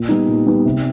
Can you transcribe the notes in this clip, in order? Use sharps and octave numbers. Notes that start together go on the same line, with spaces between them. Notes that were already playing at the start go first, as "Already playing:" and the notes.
Already playing: A#2
G3 B3 D#4
A#2
G3 B3 D#4
C3